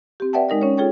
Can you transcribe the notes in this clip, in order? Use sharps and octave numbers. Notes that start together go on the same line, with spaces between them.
C4 G4
B4 D5 E5 F#5 G5 A5
G#3 D#4 A#4 D#5
C#4 C#5
F4 G#4 A4 C#5 G5